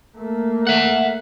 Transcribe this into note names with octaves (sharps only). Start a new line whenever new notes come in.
A3 A#3
E5 F#5